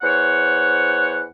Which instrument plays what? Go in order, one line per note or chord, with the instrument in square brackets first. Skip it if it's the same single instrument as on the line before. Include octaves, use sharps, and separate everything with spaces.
[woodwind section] E2 C5 C#5 F#5